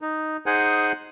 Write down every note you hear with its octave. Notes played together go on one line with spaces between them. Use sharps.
D#4
D#4 G#4 C5 F#5 G#5